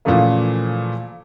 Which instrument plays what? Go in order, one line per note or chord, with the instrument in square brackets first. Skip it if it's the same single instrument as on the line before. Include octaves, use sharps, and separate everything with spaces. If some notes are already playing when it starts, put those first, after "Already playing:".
[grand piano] A#2 C#3 E3 F3 A3 A#3